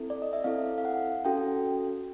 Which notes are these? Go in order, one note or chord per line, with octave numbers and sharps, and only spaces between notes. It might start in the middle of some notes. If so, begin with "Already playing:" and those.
Already playing: C4 E4 A4
D5
D#5
E5
C4 E4 A4 F5
F5
F#5
C#4 F#4 A4 G5